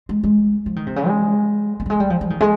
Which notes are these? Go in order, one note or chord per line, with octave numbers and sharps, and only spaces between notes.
G#3
G#3
F3
D#3
C3
C#3
G#3
A#3
G3
G#3
G3
F3
F3
D#3
G#3